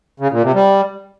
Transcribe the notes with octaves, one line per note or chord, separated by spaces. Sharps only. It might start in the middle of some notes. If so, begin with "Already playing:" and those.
C#3
A#2
C3
G3